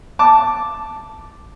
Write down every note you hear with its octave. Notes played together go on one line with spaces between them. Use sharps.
A5 D6